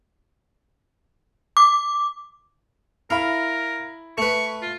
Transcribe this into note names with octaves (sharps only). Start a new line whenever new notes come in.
D6
E4 A#4 F5 B5
A3 B4 C#6
F4